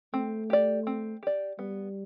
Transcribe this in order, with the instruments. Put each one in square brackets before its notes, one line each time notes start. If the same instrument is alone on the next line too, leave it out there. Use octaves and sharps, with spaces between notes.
[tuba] A3 [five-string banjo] C4
[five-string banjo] G4 D5
C4
G4 D5
[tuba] G3 [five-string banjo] B3